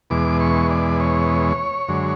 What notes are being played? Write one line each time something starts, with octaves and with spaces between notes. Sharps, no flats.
E2 B2 G#3 D6
C#6
D5
C#5
F#2 D3 G#3